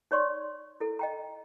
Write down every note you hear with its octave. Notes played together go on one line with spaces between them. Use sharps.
D#4 C#5 D5 C6 C#6
E4 A4
D#5 G5 A#5